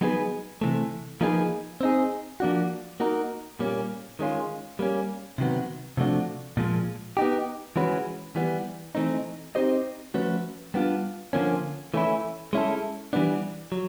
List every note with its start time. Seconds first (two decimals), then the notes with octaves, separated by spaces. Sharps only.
0.01 F#3 B3 D#4 G#4 B4
0.61 C3 E3 A3
1.21 F3 A#3 D#4 G#4 B4
1.81 C4 D#4 G#4
2.40 F3 A#3 D4 F#4
3.00 A#3 D#4 F#4 A#4
3.59 A#2 G3 A#3 C#4
4.19 D#3 G#3 C#4 F4
4.79 G3 A#3 C#4
5.38 C3 D#3 F#3 B3
5.97 C3 F3 A3 D4 F#4
6.57 A#2 F3 G#3
7.17 B3 D#4 G4
7.76 E3 G#3 C#4 F#4 B4
8.36 E3 G3 B3
8.95 E3 A3 C4 D#4
9.55 C4 D#4 G4 C5 D#5
10.14 F3 A3 C#4 F#4 B4
10.74 G3 B3 D4 F4
11.33 D3 F3 A#3 C#4
11.94 E3 A3 C#4 E4
12.53 G#3 C#4 E4 A4
13.13 E3 G3 B3 D4
13.72 F#3